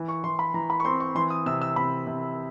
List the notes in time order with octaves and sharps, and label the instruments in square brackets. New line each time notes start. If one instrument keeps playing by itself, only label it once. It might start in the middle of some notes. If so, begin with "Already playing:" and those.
Already playing: [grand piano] E3
C#6
E3 C6
B5
E3 A#5
B5
C#6
C4 C6
C#6
E3 C6
D#6
C3 E6
E6
C3 B5
C3